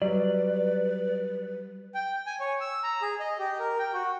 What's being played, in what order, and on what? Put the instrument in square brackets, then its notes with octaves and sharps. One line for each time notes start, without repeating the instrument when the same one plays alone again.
[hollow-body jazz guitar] F#3 G3 [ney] B4 [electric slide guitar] D5
[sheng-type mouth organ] G5
G#5
C#5
E6
A#5
G#4
D#5
G4
A#4
G5
F#4